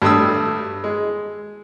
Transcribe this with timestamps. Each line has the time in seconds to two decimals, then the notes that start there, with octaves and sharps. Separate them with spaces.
0.02 G2 G3 A3 D#6 E6
0.84 G#3